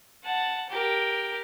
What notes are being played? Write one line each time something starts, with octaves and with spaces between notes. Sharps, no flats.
F#5 A5
G4 A#4